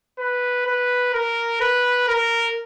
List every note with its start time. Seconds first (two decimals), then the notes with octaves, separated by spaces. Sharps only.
0.19 B4
0.66 B4
1.13 A#4
1.61 B4
2.08 A#4